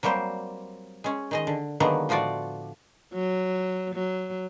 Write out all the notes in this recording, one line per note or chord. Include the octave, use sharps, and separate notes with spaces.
F#3 G3 A#3 C4 C5
G#3 C#4
D#3 G#3 D#5
D3
D3 D#3 F#3 G#3 A#3 B3
A2 F3 F4 F#4 D5
F#3
F#3